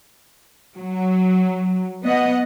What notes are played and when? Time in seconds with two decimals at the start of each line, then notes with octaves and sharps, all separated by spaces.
0.77 F#3
2.05 B3 D#5 F#5